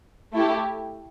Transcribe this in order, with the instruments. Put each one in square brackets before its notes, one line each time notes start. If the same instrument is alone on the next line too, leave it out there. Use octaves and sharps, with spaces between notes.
[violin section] A3 E4 G4